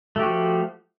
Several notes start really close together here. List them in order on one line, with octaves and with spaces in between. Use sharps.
A3 G4 F#4 F3